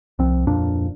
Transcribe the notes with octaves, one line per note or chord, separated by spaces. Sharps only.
C2 F3 C4
D1 F2 A#2 D4